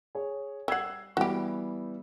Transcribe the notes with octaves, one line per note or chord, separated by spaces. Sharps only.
G#4 C#5
G3 F#5 E6 G#6 C7
E3 G3 B3 F#4 G4